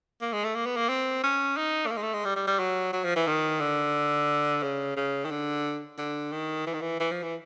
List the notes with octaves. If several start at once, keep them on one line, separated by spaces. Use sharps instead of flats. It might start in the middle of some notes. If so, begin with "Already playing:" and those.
A#3
G#3
A3
A#3
B3
A#3
C4
C#4
D#4
A3
A#3
G#3
A3
G#3
G3
G3
G3
F#3
F#3
F3
E3
D#3
D3
C#3
C#3
D#3
D3
D3
D#3
E3
D#3
E3
E3
F3
E3